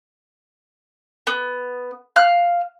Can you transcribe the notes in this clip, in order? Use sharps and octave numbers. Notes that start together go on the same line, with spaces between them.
B3
F5 F6 F#6